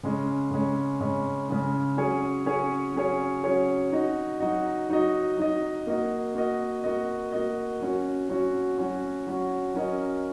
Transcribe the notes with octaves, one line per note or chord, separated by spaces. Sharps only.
C#3 G#3 C#4
C#3 G#3 C#4
C#3 G#3 C#4
C#3 G#3 C#4
F#3 C#4 G#4 C#5
F#3 C#4 G#4 C#5
F#3 C#4 G#4 C#5
F#3 C#4 G#4 C#5
F#3 D#4 F#4 D#5
F#3 D#4 F#4 D#5
F#3 D#4 F#4 D#5
F#3 D#4 F#4 D#5
A#3 F#4 D#5
A#3 F#4 D#5
A#3 F#4 D#5
A#3 F#4 D#5
F#3 C#4 F#4
F#3 C#4 F#4
F#3 C#4 F#4
F#3 C#4 F#4
F#3 C#4 A#4 D#5